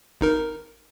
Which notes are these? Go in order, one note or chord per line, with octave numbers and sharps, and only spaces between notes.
G#1 D#4 A#4